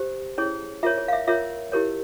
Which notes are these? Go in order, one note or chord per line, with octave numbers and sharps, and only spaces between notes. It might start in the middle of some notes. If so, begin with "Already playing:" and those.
Already playing: G4 C5
C#4 E4 G#4 C#5
F4 A#4 C#5 E5
C#5
F5
E5
F4 A#4 C#5 E5
E4 G4 A#4 C#5